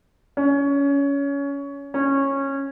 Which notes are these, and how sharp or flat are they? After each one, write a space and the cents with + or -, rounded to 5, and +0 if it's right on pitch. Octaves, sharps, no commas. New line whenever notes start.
C#4 +20
C#4 -15